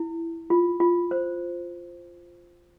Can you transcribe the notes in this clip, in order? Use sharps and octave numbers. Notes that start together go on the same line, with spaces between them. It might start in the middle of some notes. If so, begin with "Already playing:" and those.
Already playing: E4
F4
F4
C5